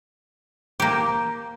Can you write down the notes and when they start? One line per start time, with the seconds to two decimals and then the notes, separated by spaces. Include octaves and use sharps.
0.80 A#3 G4